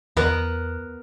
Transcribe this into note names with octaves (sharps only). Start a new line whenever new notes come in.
E2 B3 A#4 F#5